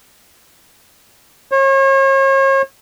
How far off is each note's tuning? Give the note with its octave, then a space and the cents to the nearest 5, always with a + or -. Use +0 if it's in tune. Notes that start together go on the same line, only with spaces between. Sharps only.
C#5 -40